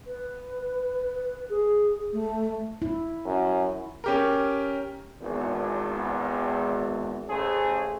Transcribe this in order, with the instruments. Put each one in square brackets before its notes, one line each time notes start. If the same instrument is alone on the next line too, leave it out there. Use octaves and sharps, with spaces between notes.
[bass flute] B4
G#4
A3
[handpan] E4
[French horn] F#2
[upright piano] C#4 G4 A#4
[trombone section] G#1 E2
A1 C#3 A3 G#4 A4 C5